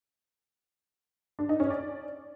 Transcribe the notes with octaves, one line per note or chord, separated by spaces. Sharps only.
D4
D#4
C#4
D5